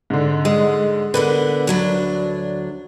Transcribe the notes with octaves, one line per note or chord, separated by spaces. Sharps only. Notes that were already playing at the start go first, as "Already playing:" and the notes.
G#2 D3
G#3
D3 B3 A#4 B4
D2 F#3 D4